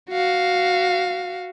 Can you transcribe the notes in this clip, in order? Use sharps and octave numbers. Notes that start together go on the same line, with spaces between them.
F#4 F5